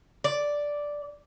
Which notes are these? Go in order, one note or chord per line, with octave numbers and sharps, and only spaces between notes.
D5